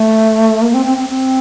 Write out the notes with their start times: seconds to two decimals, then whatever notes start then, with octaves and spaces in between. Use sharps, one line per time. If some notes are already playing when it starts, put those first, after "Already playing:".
Already playing: A3
0.62 A#3
0.74 C4
0.86 C4
0.98 C4
1.09 C4